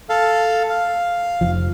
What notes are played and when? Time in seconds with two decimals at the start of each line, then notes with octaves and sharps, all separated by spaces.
0.09 A4 F5
0.70 F5
1.41 F1 F3